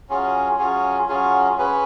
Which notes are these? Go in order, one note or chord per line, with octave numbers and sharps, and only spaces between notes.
F#3 C#4 F4 G#4
F#3 C#4 F4 G#4
F#3 C#4 F4 G#4
C#4 G#4 B4